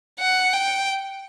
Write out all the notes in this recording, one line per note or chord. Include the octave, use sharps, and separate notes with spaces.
F#5
G5